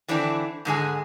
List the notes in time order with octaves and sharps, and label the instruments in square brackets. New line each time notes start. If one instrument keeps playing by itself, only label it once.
[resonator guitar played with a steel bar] D3 E3 A3 C4 D4 E4
G#2 D3 G#3 G#5